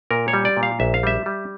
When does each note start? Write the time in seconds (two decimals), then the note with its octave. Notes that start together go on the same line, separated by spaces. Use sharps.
0.11 A#2 A#4
0.28 C#5
0.33 G3
0.45 D5
0.57 A#2
0.63 F5
0.80 A#1 E5
0.94 F5
1.03 G3 E5
1.26 G3